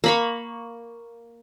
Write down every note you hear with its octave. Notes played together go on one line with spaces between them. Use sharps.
A#3 B5 C#6